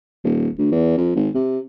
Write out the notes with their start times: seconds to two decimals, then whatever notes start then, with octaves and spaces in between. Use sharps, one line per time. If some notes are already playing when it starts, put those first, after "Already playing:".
0.24 D#1
0.58 D2
0.72 E2
0.97 F2
1.15 G#1
1.35 C3